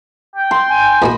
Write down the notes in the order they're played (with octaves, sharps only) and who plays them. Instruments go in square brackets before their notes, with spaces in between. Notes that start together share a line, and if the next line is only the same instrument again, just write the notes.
[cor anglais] G5
[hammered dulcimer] C6
[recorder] G#5
[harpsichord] E2 A#3 F#4 [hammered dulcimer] D#5 B5